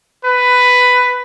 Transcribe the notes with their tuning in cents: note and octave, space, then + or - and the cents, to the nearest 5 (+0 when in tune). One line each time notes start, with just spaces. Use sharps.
B4 +10